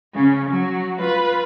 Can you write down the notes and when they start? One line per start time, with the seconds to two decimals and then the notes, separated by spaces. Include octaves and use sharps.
0.14 C#3 C#4
0.50 F#3
0.97 F4 B4